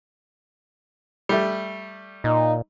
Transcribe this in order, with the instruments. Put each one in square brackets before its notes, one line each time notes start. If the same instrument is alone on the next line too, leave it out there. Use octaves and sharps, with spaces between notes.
[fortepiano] G3 A3
[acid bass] A#2 [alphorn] D#4